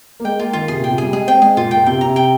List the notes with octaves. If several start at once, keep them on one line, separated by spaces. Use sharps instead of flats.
A#3
G#3 G5
A#3 F4
D#3 F4
C3 G#4
A#2 G5
C3
G3 G#4
G#3 G#4
C4 G5
G#3 G#4
A#2 F4
A#2 G5
C3 G5
C3 A#5
G5